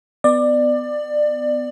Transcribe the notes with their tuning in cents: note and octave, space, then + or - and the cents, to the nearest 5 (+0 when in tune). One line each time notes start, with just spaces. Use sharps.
B3 +20 D5 +20